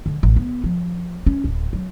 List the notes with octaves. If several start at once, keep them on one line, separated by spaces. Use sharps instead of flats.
D3
A1
B3
F3
C#4
D1
F#3